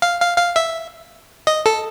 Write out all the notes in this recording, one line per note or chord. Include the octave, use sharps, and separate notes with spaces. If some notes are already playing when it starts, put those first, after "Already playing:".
F5
F5
F5
E5
D#5
A4